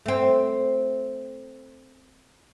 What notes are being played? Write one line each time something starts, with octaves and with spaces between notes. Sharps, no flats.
A3 C4